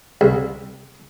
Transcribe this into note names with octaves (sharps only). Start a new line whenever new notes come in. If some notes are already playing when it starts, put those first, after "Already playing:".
C2